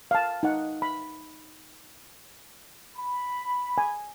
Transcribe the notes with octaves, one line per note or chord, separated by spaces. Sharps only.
F5 A5
D#4 F#5
B5
B5
G#5